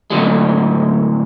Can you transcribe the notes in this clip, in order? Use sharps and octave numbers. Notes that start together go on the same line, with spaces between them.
A2 D3 F#3 G#3